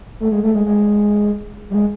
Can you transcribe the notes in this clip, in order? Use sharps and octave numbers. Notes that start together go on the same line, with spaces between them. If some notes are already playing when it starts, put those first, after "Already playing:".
A3
G#3
A3
G#3
G#3
G3
G#3